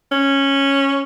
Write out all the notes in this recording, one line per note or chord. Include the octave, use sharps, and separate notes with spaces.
C#4